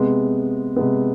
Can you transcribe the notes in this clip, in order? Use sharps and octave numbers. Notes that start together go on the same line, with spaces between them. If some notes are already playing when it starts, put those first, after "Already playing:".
Already playing: C3 G#3 B3
C3 G#3 B3